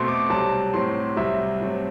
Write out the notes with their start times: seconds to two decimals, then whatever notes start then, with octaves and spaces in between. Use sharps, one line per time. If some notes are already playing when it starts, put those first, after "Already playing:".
Already playing: B2 A3 C4 C6
0.08 D6
0.30 C2 C3 F#3 A5
0.74 A2 F#3 C4 C6
1.17 C2 C3 F#3 E5
1.60 G2 F#3 A3 C4